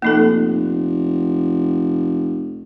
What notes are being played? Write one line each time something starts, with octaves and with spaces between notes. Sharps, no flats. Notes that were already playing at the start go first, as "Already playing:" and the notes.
F1 A#3 D#4 A4